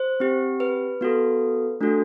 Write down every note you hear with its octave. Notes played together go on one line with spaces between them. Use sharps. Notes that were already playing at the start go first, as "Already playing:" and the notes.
Already playing: C5
C4 G4
B4
B3 F#4 A4
A3 D4 F#4 A4